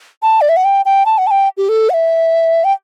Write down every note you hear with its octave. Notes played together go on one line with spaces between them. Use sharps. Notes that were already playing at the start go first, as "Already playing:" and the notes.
A5
D5
E5
F#5
G5
G5
A5
F#5
A5
G5
G4
A4
F#5
E5
G5